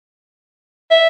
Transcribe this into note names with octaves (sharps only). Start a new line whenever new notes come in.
E5